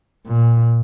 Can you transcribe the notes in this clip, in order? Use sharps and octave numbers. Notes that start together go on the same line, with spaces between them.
A#2